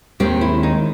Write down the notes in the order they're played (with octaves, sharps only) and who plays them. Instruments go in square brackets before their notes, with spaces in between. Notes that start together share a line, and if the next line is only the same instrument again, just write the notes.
[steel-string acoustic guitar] D#2 D#3 G#3 C4 [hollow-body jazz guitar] G4
[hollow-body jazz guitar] E4
D#4